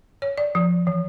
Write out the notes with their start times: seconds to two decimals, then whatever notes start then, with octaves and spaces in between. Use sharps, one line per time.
0.22 C#5
0.38 D5
0.55 F3
0.87 E3